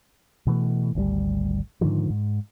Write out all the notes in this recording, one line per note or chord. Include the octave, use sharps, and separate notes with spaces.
B2 E3 A3
G#1 D2 D#3 G3
G#2 D3 D#3 F3
G#2